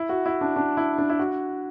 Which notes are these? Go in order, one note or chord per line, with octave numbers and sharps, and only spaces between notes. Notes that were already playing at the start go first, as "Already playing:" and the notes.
Already playing: E4
F#4
E4
D4
D4
E4
D4
E4
F#4